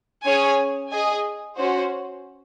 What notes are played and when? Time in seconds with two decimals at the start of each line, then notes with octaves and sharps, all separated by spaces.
0.24 C#4 G#4 C#5 G#5
0.90 G#4 D#5 G#5
1.56 C#4 F#4 C5